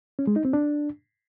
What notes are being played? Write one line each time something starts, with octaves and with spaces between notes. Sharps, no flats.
C#4
G#3
D#4
C4
D4